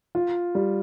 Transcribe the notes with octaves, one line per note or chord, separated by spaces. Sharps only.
F4
G3